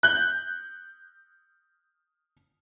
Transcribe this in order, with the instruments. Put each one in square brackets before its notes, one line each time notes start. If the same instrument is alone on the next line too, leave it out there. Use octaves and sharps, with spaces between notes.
[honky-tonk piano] F#6 G6